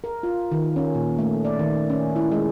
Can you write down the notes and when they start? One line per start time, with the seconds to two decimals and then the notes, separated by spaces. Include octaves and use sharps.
0.04 A#4
0.23 F4
0.52 D#3
0.76 C#4
0.95 A#2
1.19 A3
1.45 D5
1.59 D#3
1.90 C#4
2.16 E4
2.31 G#3